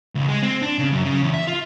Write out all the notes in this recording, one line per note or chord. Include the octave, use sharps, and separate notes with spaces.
C#2
G#3
C4
D4
C#3
F#2
C#3
E2
E5
F4